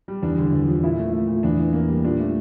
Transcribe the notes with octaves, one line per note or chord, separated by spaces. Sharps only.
G3
E2 D4
D3
E2
F3
A#2 E4
A3
A3
A#2
E2 D4
E3
A#3
G3
A#2 D4
A3